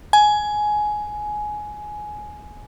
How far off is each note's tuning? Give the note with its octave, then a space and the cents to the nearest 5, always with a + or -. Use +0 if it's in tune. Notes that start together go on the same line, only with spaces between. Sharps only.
G#5 +15